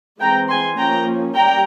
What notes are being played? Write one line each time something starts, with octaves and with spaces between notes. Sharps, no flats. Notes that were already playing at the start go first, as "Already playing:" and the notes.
E3 G#3 C4 G5 A#5
G#5 C6
F3 A#3 C#4 G5 A#5
G3 G5 A#5